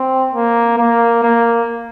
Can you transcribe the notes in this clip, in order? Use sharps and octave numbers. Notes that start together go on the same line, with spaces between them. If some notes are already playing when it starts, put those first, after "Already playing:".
Already playing: C4
A#3
A#3
A#3